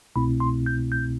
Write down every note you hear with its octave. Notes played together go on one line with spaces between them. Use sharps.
C2 B2 A3 C4 E4 B5
C6
G6
G6